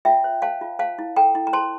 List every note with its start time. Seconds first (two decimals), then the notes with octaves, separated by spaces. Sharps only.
0.05 F4 E5 G5
0.24 C5
0.42 C5 F5 A5
0.61 F4
0.79 C5 F5 A5
0.99 E4
1.16 A4 G5 A#5
1.35 E4
1.47 A#5
1.53 C5 A5 C6